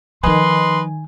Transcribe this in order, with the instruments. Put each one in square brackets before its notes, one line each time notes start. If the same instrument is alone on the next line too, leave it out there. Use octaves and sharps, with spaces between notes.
[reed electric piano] D#3 G#5 [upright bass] F3 D#4 [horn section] B4 D#5 C6